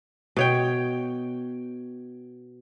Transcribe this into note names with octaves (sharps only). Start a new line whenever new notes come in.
B2 C#5 G5